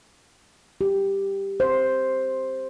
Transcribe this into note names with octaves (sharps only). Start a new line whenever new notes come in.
G4
C5